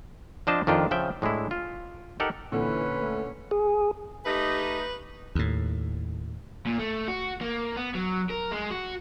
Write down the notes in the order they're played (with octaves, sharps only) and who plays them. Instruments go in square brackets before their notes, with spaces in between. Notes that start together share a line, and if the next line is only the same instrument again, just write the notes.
[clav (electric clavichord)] F3 C4 D4 C5 D#5 A5
F2 D#3 D4 F4 G5
C#3 F3 E5 G5
A2 G#3 D4 E4
F4
D#4 G4 A4 A#4 F#5
[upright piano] A#2 D3 [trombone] E3 [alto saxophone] C#4 [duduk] B4
[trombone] A3
[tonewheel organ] G#4
[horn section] A3 D#4 [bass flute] G4 [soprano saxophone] B4
[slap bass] D#2 A2
[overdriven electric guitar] A#2
A3
F#4
A#3
B3
F#3
A#4
G#3
F#4